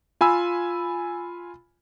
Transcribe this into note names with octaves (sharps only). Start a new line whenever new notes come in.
F4 G#5 B5 E6